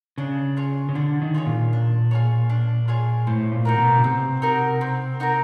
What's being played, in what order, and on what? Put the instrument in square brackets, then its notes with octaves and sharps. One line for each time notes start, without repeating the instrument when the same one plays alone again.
[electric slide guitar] C#3 [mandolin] D4
[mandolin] F4 G#4 C#5
[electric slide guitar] C#3
[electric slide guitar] D3 [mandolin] D4
[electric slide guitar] D#3
[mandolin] F4 G#4 C#5
[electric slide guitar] A#2
[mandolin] D4
F4 G#4 C#5
D4
F4 G#4 C#5
[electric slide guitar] A2 [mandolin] C4
[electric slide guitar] A#2
[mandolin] D#4 F#4 A#4
[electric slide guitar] B2
B2
[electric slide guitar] C3 [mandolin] C4
[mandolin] D#4 F#4 A#4
C4
D#4 F#4 A#4